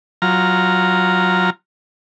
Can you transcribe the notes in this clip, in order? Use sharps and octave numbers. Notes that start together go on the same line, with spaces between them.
F#3 F4 A#5